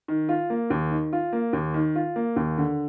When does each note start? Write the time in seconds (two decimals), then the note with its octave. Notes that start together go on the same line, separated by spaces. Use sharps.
0.08 D#3
0.29 F4
0.50 A#3
0.70 D#2
0.92 D#3
1.13 F4
1.33 A#3
1.53 D#2
1.74 D#3
1.96 F4
2.16 A#3
2.36 D#2
2.58 D3